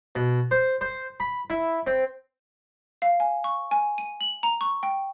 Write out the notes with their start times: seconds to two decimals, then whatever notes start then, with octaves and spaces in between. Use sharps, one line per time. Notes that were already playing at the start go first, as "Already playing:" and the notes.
0.16 B2
0.51 C5
0.81 C5
1.20 B5
1.50 E4
1.87 C4
3.02 F5
3.20 G#5
3.44 C#6
3.71 G#5
3.98 D#7
4.21 F#7
4.43 A#5
4.61 C#6
4.83 G5